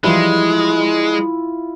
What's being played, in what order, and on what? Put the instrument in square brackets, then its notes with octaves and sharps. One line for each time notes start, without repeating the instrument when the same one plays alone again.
[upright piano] E3 F3 G3 [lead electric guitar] G#3 [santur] E4 F4